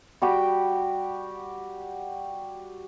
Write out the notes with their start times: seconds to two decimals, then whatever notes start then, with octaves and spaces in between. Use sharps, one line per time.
0.22 G3 F#4 G4 G5